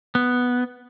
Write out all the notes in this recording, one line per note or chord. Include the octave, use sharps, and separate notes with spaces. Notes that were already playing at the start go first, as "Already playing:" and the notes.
B3